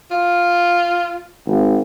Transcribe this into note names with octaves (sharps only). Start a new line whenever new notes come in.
F4
G#1